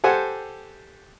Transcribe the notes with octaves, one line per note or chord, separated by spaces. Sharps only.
G4 A4 C5 F#5 G#5